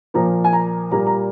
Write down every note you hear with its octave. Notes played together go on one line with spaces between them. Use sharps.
A#2 F3 A#3 A#5
G#5
A#5
A#2 G3 A#3 A#5
A#5